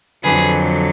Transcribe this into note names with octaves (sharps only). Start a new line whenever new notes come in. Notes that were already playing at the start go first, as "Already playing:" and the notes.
F2 D3 F#3 G#4 B4